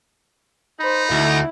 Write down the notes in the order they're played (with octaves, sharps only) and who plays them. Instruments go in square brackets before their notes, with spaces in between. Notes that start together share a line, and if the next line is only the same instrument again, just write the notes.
[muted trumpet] D#4 [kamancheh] C5 B5
[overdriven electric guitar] D2 [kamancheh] E4